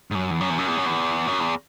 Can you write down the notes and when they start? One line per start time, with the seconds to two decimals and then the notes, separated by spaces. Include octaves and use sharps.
0.11 G#2
0.15 F#2
0.31 E2
0.41 F#2
0.50 E2
0.59 F#2
0.68 E2
0.77 F#2
0.86 E2
1.27 F#2
1.40 E2